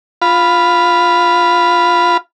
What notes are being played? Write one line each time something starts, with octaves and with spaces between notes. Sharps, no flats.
F4 B5